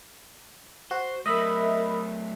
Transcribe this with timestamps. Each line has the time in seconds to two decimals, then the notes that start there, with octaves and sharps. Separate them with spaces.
0.91 F#4 C5
1.26 F#3 A3 A#4 D#5 E5 B5